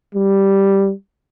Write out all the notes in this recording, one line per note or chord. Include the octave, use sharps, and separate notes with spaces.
G3